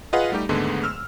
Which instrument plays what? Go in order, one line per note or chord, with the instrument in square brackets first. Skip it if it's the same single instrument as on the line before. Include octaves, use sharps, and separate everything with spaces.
[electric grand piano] F4 G#4 B4 D#5 F5 F#5
G3 A3 D#4 G4
D#2 G#2 D3 G#3 A3 B3
E6 F6